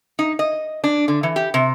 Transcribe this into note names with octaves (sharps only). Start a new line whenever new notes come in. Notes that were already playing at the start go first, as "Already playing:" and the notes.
D#4
D#5
D4
D3
E3
G4
C3